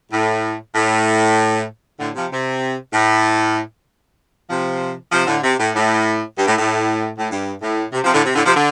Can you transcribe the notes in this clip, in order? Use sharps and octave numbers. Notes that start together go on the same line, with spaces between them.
A2
A2
A2 D3
C3 F3
C3
A2
C3 F3
C3 F3
A2 D3
C3
A2
A2
G2
A2
A2
A2
G2
A2
C3
C3 F3
A2 D3
C3
A2 D3
C3 F3
D3